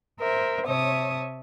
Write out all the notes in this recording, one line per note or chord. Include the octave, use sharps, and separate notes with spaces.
A#4 C5 E5
C3 C#5 E5 A5 D#6